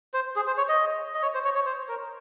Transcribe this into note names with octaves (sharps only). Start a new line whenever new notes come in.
C5
G#4
C5
C#5
D#5
D#5
C#5
C5
C#5
C#5
C5
A#4